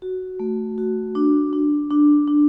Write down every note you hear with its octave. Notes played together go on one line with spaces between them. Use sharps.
F#4
A3
F#4
D4
D4
D4
D4